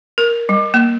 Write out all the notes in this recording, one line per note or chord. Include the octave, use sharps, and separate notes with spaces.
A#4
G3
A#3